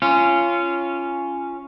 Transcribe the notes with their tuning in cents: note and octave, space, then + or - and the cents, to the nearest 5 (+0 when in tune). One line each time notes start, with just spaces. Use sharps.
C#4 +0 F4 -20